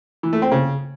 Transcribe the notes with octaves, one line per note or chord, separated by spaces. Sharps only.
E3
A3
C4
C#3